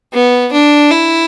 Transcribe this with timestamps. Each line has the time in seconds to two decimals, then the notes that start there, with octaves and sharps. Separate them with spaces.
0.14 B3
0.53 D4
0.91 E4